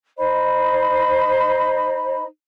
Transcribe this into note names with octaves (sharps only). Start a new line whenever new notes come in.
D#4 C5 D#5 B5